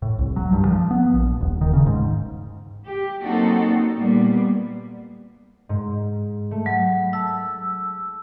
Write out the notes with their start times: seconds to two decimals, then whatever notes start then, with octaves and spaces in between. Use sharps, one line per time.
0.02 A2
0.19 C2
0.36 F#3
0.52 G2
0.65 F3
0.91 B3
1.13 A#1
1.41 D#1
1.61 D#3
1.73 C#3
1.86 G#2
2.85 G4
3.20 F#3 A#3 C4 D#4 F#4 A4
3.96 A#2 G3 A#3 B3
5.69 G#2
6.51 A3
6.66 F#3
7.13 A5 E6